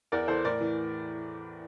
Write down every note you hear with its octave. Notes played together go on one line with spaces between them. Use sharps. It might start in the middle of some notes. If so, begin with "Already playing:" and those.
E2 A#4 D5
E3 A4 C5
A2 A#4 D5
E3